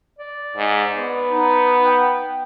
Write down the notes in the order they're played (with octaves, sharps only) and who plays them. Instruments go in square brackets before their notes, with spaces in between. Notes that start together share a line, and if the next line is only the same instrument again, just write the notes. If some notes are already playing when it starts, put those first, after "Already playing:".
[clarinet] D5
[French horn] G#2
B3
[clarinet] D#4
G5